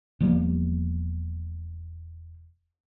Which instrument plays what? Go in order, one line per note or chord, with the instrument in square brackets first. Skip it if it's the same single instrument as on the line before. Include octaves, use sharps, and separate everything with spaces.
[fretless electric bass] E1 F3 G3 A#3